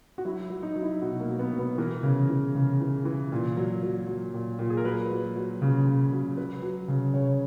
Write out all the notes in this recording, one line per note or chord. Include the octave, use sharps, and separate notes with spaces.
F#4
F#3 E4
F#3
D#4
F#3
E4
B2 F#4
A#3
F#3
B3
B2
B3
E3 A#4
C#3
E3
C#3
E3
E3
A#2
F#3
F#3
F#3
A#2
A#2
G#4
A#4
F#3 B4
F#3
F#3
C#3
C#3
F#3
F#3 B4
F#3
C#3
C#3 C#5